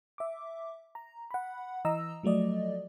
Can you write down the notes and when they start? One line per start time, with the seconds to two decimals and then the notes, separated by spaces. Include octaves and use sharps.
0.18 E5 D6
0.95 A#5
1.31 F#5 B5
1.85 E3 D#5 A#5 E6
2.23 F3 F#3 A3 D5 D#5